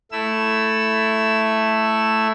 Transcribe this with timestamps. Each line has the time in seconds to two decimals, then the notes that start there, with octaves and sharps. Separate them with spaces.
0.12 A3 E4 E6